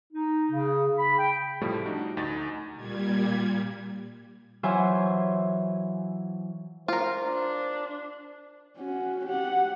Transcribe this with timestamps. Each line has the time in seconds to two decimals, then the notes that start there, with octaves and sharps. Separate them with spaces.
0.13 D#4
0.52 C#3
0.98 B5
1.18 G5
1.61 A2 C3 F3 G3 A3
1.85 D4 D#4 F#4
2.17 D2 D#4 A6
2.76 A#2 G3 G#6
4.63 E3 F#3 F4 C5 E5 G#5
6.88 F4 A#4 C5
7.24 D4
8.77 C#4 F#4
9.26 G4 F#5